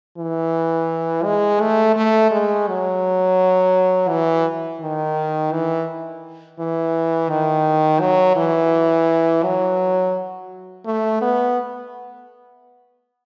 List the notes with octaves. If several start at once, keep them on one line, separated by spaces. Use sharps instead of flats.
E3
G#3
A3
A3
G#3
F#3
E3
D#3
E3
E3
D#3
F#3
E3
F#3
A3
B3